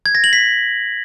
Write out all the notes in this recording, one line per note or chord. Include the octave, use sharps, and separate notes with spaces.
G#6
A#6
F#7
B6